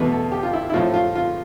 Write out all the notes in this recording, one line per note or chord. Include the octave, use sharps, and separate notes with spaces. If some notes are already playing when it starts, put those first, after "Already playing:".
Already playing: E2 B2 A3 B4
A4
G4
F4
E4
E4
A2 F3 A3 F4
F4
F4